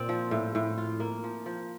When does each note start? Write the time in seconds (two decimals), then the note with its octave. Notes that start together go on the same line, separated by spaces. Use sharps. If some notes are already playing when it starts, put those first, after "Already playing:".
Already playing: A#2 C4 D5
0.09 F3
0.31 A2
0.55 A2
0.78 F4
1.00 A#3
1.24 F3
1.46 F3